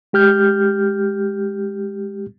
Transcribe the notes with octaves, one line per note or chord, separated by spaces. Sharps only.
G#3 G4 F6 G6